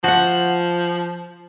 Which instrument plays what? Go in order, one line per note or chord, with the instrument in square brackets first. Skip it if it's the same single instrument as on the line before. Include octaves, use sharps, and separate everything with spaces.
[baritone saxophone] F3 [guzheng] F#4 F#5